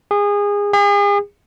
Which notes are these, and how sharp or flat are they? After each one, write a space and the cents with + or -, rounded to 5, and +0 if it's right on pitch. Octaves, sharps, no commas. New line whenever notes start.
G#4 -25
G#4 -40